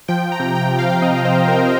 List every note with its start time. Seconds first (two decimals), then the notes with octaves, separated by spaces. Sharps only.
0.08 F3 G5
0.32 A#5
0.40 C3
0.55 G5
0.71 C3
0.79 F5
0.93 F5
1.02 C4 D#5
1.25 C5
1.33 F3
1.48 A#4
1.63 C3